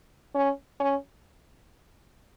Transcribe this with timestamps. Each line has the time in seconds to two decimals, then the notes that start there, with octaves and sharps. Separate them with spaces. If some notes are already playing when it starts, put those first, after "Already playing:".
0.35 C#4
0.80 C#4